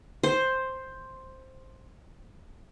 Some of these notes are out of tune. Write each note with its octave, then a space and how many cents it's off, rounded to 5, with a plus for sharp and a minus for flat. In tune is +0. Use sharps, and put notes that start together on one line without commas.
C5 +5